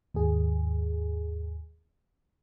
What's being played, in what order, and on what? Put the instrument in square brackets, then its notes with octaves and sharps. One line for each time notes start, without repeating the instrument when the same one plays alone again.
[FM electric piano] D#2 G#2 G#4